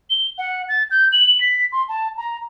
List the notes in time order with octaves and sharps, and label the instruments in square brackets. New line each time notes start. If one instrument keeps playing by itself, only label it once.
[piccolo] G7
F#5
A6
G6
F#7
B6
C6
A5
A#5